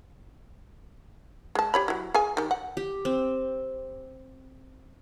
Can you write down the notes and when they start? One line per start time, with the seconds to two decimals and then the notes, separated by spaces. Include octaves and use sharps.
1.55 G#3 A5
1.74 G4 C#5 B5
1.88 F#3 E4
2.14 G#4 F5 G#5
2.37 D#3 G4
2.51 F#5
2.77 G4
3.05 C4